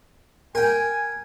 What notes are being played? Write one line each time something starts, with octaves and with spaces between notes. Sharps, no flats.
A#4 G5 G#5